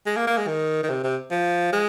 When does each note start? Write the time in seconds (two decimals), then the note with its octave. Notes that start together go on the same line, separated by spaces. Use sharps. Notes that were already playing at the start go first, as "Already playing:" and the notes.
0.06 G#3
0.16 A#3
0.27 A#3
0.37 G#3
0.47 D#3
0.83 D#3
0.89 C3
1.03 C3
1.31 F3
1.72 G#3